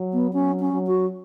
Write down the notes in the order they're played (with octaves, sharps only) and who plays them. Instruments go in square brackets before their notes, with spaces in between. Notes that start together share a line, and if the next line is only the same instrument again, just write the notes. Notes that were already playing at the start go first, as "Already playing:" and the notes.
Already playing: [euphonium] F#3
[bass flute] B3
[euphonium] F#3 [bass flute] C#4
[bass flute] C#4
[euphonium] F#3
[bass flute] F#4